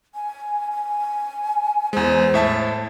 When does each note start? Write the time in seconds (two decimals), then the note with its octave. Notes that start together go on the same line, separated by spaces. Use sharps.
0.15 G#5
0.71 G#5
1.93 E2 G#3 C5
2.34 A2 E5 A5